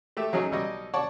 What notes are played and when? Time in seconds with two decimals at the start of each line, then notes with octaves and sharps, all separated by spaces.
0.17 A3 G4 E5
0.33 F#3 C#4 D#4 G#4
0.51 B1 G3 C#5 D#5
0.94 C#5 D5 F#5 A5 C#6